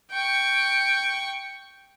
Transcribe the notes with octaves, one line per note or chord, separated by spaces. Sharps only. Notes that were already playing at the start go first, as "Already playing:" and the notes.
G5 C#6